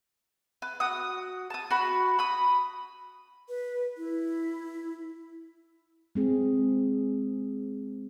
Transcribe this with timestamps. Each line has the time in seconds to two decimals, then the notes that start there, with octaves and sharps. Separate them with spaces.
0.62 B4
0.80 F#4 D#6
1.50 A5 D#6
1.70 F#4 B5
2.19 B5 D#6
3.49 B4
3.98 E4
6.15 G#3 C4 G#4